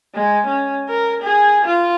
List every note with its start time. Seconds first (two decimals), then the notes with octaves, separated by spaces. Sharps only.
0.15 G#3
0.47 C#4
0.88 A#4
1.23 G#4
1.65 F4